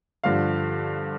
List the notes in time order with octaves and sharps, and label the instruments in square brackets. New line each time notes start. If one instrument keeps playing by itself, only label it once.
[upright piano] G2 D3 F3 F5